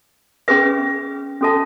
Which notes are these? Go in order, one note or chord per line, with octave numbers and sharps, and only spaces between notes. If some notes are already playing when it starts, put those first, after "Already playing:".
C#4 G#4 B4 E5
C#4 F#4 A4 E5 A5